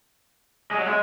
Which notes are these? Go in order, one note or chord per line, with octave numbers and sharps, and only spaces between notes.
G#3
F#3
G#3